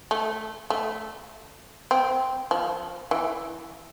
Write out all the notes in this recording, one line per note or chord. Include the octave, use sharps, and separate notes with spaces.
A3
A3
C4
F3
E3